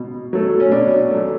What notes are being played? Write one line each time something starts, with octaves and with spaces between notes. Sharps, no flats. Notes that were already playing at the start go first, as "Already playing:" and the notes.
Already playing: B2
F#3 A3
C#4
B2 D4
F#3 A3